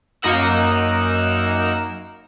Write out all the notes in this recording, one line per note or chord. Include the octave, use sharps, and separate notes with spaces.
F#2 A#3 D#4 A#4 F#5 E6